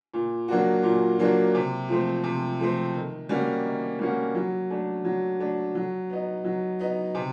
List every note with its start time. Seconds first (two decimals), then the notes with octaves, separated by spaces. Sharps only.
0.14 A#2
0.48 F#3 A#3 D4 F#4
0.83 A#2
1.19 F#3 A#3 D4 F#4
1.55 C3
1.89 F3 A3 C4
2.24 C3
2.59 F3 A3 C4
2.94 D#3
3.29 G3 A#3 C#4 F#4
3.65 D#3
3.99 G3 A#3 C#4 F#4
4.35 F#3
4.70 A3 D4
5.04 F#3
5.39 A3 D4
5.75 F#3
6.10 B3 D#4
6.44 F#3
6.79 B3 D#4
7.15 C3